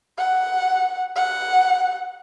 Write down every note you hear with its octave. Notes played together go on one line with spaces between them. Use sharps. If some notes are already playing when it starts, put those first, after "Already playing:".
F#5
F#5